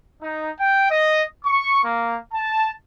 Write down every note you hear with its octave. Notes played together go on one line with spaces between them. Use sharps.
D#4
G5
D#5
C#6
A#3
A5